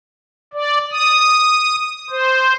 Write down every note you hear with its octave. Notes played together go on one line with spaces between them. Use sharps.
D5
D#6
C5